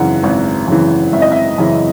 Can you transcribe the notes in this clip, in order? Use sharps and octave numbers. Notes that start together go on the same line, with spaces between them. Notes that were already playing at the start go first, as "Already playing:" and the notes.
Already playing: G#1 F#2 C#3 E3 F#5
G#1
F#2 C#3 E3
G#1 E5
D#5
E5
F#2 C#3 E3